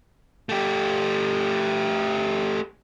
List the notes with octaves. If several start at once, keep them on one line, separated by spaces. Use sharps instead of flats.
A3 G4